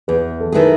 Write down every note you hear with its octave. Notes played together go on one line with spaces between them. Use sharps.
E2 G#4 B4
A4
D#3 A3 E4 G#4 B4